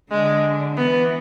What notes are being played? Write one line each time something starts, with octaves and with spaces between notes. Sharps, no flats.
D3 G#3
E3 B3